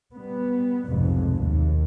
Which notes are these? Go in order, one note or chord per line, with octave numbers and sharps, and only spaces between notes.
G3 B3
F1 B1 F2 G#2 C3
D#2